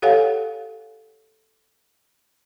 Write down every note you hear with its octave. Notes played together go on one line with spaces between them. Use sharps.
G4 A4 C#5 F5 F#5 G#5